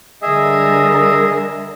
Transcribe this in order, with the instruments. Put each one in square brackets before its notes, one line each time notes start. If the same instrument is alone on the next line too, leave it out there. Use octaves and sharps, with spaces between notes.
[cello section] D3 G3 A#4 [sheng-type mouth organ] G#4 D#5 E5